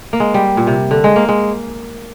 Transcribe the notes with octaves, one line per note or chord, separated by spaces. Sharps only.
A#3
G#3
G3
A#2
C3
D3
G#3
A#3
G#3